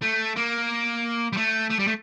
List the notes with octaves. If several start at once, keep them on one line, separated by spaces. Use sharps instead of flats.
A3
A#3
G3
A3
A3
G3
A3